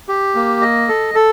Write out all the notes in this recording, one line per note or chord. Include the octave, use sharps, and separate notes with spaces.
G4
A#3
D#5
A4
A4